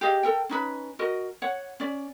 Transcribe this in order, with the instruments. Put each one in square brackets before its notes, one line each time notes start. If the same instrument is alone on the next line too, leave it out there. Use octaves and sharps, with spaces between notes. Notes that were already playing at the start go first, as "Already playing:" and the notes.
[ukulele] G4 G#4 D#5 F5
A4 A#4 G5
C#4 D#4 B4
F#4 A#4 D#5
C#5 F#5
C#4 D5